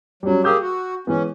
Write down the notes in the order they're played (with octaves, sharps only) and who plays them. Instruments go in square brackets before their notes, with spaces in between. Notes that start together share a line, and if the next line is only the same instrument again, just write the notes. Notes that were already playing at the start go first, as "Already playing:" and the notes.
[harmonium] F#3 [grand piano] G3 C#4
[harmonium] A#3 G4 G#4 [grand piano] E6 G6
[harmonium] F#4
[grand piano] E3 G#3 B3 [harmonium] C#4